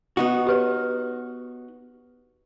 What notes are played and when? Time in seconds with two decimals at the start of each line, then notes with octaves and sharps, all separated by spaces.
0.17 B3 D#4 F#4
0.47 G4 B4 C#5